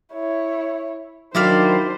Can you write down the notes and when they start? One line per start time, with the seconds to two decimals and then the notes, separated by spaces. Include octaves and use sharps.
0.14 E4 C#5
1.35 D#3 F#3 D4 E4 C5 D5 F5